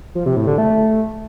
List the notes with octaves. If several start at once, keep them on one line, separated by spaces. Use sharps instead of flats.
F3
C3
A2
D3
A3